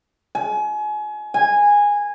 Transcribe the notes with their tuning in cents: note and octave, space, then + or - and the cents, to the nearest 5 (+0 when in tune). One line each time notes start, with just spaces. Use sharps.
G#5 +30
G#5 -15